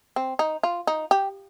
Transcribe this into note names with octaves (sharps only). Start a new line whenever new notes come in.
C4
D#4
F4
D#4
G4